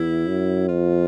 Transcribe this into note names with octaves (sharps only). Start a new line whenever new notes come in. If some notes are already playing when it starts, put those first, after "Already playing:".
Already playing: E2 E4
F#2
F2 F4